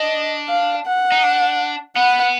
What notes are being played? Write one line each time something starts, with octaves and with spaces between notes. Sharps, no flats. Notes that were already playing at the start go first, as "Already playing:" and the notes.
Already playing: D4 D#5
F5
F#5
D#4
D4
B3 F#5